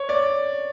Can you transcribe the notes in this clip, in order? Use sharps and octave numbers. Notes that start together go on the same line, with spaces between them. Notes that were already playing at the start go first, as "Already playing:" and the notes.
Already playing: C#5
D5